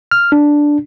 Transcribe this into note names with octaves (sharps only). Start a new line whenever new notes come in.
F6
D4